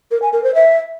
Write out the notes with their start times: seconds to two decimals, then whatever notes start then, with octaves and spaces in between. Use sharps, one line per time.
0.11 A#4
0.22 G#5
0.33 A#4
0.44 C5
0.55 E5